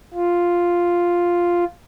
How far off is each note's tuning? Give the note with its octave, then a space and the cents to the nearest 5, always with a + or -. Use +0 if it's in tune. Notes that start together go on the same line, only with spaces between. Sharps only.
F4 +0